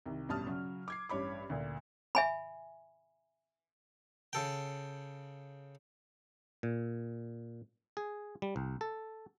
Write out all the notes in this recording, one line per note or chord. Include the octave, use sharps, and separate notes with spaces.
C2 D#3
A1 G2 B2 A5 D#6 F6
C#3 F#3
D6 G#6 C7
A1 G2 C#5 B5 D6
D2 A#2
E5 G#5 B5
C#3 A4 G5
A#2
G#4
G3
C2
A4